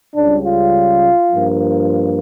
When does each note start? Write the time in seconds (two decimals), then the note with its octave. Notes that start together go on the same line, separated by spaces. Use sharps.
0.15 C#2 C#3 G3 D4
0.44 F4
1.32 G2 F3 A#3